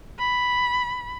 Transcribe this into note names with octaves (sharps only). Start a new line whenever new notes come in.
B5